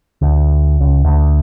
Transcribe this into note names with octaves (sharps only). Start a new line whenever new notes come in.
D2
C#2
D2